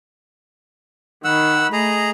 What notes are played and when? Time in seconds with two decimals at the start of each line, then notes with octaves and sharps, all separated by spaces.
1.24 D#3 F#5 B5 E6
1.73 A3 G#4 D#5 A#5